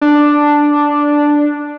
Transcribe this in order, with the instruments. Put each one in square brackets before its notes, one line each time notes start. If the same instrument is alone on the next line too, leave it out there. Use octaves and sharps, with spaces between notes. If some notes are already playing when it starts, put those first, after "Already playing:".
[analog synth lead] D4